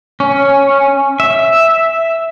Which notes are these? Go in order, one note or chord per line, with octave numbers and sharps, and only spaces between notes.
C#4
E5